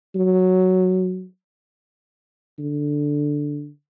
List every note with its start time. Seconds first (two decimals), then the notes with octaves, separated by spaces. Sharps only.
0.15 F#3
2.59 D3